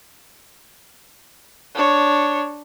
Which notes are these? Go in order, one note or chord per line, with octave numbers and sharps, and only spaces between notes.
D4 C#5